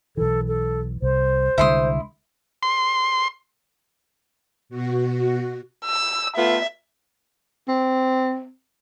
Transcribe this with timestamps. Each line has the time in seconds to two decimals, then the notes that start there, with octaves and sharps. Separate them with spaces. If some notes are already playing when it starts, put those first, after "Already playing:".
0.17 B1 E3 A4
0.48 A4
1.02 C2 C5
1.58 C2 D3 G#3 E4 C6 D#6
2.63 C6
4.69 B2 F#4
5.86 E6
6.37 A3 B3 F4 E5
7.68 C4